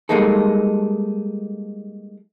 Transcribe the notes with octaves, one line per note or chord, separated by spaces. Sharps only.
G3 G#3 A#3 D#4 A4